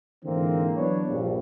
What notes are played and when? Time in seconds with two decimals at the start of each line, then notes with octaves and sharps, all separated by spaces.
0.25 G#2 D3 E3 A#3 C4
0.76 E3 F#3 B3 D4 B4 C#5
1.08 A#1 G2